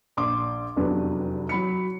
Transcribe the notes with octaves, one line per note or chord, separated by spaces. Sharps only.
A#1 C6 D6
F1 E2 C3 F#3 D4 B4
F#3 B5 C#7